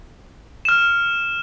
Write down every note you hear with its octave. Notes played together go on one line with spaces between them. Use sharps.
F6 E7